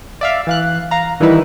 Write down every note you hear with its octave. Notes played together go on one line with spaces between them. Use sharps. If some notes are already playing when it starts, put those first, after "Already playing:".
D5 E5 F5
E3 F5 F#6
F5 A#5
D#3 E3 G3 D#4 E4 B4